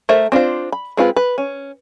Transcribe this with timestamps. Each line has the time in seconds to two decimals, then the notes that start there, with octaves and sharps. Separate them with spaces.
0.09 A3 A#4 C5 E5
0.32 C4 D4 F4 C5
0.72 B5
0.97 G#3 C4 F4 B4
1.16 B4
1.38 C#4